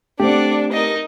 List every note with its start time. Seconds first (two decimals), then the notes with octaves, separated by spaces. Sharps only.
0.20 A3 C4 D4 G4 D5 F#5
0.73 D#4 A#4 D#5